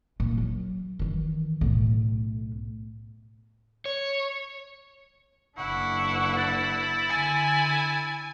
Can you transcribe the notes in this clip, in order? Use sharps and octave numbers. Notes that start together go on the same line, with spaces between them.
A#2 D#3
F#3
D#3 E3
B1 A2
C#5
F#1 D4 E4 F#5 C#6
A6
D3 G#5